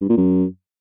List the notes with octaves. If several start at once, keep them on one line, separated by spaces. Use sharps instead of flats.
G2
A#2
F#2